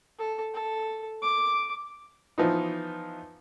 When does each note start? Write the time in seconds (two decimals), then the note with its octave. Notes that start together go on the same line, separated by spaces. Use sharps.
0.19 A4
0.55 A4
1.22 D6
2.38 E3 F3 B3 D#4